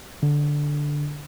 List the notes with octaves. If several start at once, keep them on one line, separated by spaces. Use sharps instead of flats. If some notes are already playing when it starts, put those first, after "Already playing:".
D3